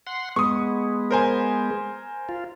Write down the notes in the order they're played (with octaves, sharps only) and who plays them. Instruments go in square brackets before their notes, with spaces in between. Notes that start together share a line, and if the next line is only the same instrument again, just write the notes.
[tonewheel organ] F#5 C6
[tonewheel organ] G#3 B3 [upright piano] C#6 D#6
[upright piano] A#4 C5 G#5
[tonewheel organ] F4